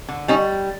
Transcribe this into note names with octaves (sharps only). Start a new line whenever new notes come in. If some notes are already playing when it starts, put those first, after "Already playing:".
D3
G3 C#4 D#4